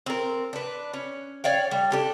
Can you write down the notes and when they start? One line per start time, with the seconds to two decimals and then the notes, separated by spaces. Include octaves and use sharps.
0.06 C4 A#4
0.53 D4 B4
0.94 C#4
1.44 C#5 D5 F5 G5
1.71 G3
1.91 D4 G4 A4